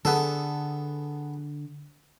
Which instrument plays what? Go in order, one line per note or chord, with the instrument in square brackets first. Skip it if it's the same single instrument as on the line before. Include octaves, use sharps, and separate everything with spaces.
[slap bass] D3 [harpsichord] B3 G#4 A4